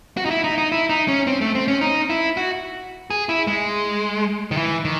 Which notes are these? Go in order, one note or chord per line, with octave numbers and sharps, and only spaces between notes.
F#4
D#4
E4
D#4
D#4
E4
D#4
C#4
C4
A3
C4
C#4
D#4
E4
F#4
G#4
E4
G#3
D#3
E3
D#3